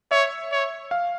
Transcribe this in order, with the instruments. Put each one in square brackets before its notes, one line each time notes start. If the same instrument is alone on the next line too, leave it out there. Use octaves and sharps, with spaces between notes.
[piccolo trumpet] C#5 [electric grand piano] E5
[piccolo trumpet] C#5
[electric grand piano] F5